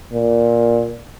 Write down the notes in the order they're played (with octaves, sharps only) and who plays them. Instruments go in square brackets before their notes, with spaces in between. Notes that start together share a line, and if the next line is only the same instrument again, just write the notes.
[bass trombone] A#2